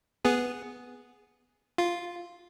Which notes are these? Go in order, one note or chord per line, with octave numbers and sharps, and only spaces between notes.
B3 G#4
F4